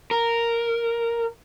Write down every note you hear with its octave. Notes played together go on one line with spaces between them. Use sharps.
A#4